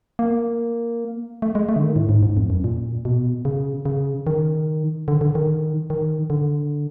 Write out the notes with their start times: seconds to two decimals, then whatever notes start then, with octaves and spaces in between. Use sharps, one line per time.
0.19 A#3
1.42 A3
1.55 G#3
1.69 A3
1.76 D3
1.83 D#3
1.96 A2
2.09 G#2
2.17 A2
2.23 G#2
2.37 F2
2.50 F#2
2.64 A#2
3.05 B2
3.45 C#3
3.86 C#3
4.27 D#3
5.08 D3
5.21 D3
5.35 D#3
5.90 D#3
6.30 D3